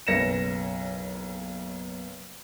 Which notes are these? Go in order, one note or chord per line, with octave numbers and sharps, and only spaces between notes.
F#1 B1 B4 A#6 C#7 E7